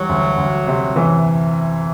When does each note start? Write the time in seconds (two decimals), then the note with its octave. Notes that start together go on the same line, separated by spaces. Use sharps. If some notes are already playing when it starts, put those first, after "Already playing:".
Already playing: E3 F#3 G3
0.09 D2
0.37 D2
0.67 C3
0.96 E3